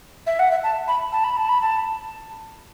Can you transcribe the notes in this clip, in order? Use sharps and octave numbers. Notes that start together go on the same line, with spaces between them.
E5
F#5
E5
A5
B5
A5
B5
A5
B5
A5